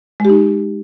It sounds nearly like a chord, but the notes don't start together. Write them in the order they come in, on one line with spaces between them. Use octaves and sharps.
G#3 G4 D#4